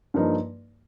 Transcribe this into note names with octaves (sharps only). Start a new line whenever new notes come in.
G2 F3 A#3 D#4